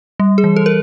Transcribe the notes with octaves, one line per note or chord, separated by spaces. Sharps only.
G3
G#4
E3
A4
A#4